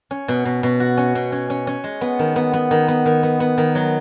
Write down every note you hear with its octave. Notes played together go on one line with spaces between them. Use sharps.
C#4
B2
B2
B2
F#4
C#4
B2
C#4
C#4
C#4
G#3
B3
D#3
B3
B3
D#3
B3
D#3
B3
B3
D#3
F#3